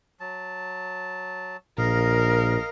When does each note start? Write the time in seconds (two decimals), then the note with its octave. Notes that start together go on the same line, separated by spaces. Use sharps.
0.20 F#3 A5
1.78 A#1 A#2 A#4 D#5 F5